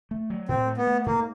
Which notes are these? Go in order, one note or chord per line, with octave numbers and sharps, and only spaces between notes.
A3
F#3
A2 C4
A3
B3
A3
G#2 A#3